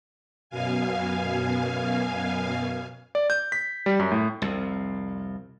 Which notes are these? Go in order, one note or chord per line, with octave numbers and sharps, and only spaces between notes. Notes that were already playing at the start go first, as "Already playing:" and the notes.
F#2 B2 F5 G#5
D5
G6
B6
G3
F#2
A2
C2 F2